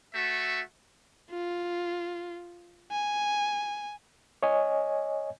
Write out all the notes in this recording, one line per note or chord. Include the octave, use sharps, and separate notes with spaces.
A3 F#4 E5
F4
G#5
C#5 D#5 G#5